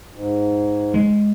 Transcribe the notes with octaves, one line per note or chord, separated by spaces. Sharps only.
G#2
G#3